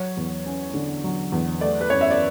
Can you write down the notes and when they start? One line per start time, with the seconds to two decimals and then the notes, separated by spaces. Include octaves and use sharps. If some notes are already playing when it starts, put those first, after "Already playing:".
Already playing: F#3 C#5
0.17 E2
0.46 C#4
0.74 D3
1.04 F#3
1.32 E2
1.61 A3 D5
1.81 B4
1.90 F#2 C#5
2.01 E5
2.11 D5